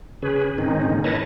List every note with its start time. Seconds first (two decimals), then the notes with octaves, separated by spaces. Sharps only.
0.22 C#3 C#4 G#4 B4
0.58 G#2 D#3 C4 C#4 D#4
0.91 G#2 D3 A#3
1.04 E4 A#4 B4 C#5 D#5 A5